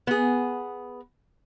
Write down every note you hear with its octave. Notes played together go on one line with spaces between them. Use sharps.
B3 G#4